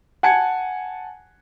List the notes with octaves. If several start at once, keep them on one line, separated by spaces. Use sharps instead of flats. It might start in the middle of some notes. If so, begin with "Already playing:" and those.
F#5 G#5 A5 G#6 C#7